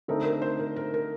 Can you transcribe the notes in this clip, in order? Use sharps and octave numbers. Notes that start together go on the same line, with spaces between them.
D3 A3 C4 D#4 A#4
A#4
C5
A#4
A#4
A#4